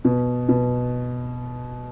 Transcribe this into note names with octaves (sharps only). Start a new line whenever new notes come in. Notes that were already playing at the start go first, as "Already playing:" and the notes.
B2
B2